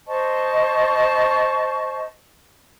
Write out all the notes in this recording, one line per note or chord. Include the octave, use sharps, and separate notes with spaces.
C5 D#5 A5 C#6